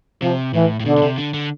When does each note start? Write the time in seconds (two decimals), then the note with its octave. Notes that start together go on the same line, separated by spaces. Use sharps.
0.22 C3 F3
0.54 A2 E3
0.80 A2
0.86 B2 D3
0.97 B2
1.02 C3
1.18 D3
1.34 D3